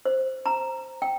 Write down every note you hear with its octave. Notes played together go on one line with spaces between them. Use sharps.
C5
A#5
G5